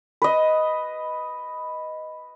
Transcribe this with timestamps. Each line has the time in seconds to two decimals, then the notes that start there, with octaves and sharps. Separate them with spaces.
0.22 B4 D#5